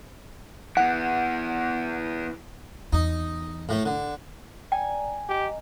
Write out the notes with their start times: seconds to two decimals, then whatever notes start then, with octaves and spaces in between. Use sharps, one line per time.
0.77 E3 B3 F#5
2.93 E2 D#4
3.69 A2 A3
3.86 D3
4.72 D5 G5 G#5 A#5
5.29 G4 D#5 A#5